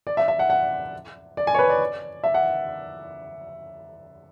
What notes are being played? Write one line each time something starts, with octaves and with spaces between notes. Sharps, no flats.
D5
E5
E5
F#5
F#5
D5
G#5
C#5
B4
D5
E5
F#5